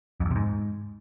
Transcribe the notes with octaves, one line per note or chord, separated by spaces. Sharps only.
F2
E2
C3
G#2